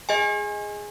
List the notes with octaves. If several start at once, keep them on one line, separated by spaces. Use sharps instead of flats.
G#4 D#5 G#5